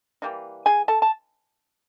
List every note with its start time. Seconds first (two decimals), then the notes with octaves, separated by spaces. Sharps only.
0.22 E3 G3 A#3 D#4
0.66 G#4 G#5
0.88 A4 A5
1.02 A5